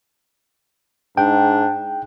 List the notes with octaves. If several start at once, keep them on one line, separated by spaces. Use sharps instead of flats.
G#2 D4 G5